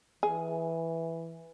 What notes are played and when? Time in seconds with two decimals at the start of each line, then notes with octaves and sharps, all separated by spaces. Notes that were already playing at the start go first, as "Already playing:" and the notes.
0.23 E3 G#4